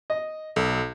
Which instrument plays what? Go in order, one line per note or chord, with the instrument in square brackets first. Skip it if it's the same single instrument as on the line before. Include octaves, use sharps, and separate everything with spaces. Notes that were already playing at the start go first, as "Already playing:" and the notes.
[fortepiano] D#5
[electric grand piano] B1 [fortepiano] A4